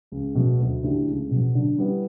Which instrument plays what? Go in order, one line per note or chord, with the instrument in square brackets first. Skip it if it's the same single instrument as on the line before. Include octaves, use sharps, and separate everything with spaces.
[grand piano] C#2
B2 F#3 A3
D2
D3 A3 E4 G4
C#2
B2
F#3
D3
G3 B3 E4 G4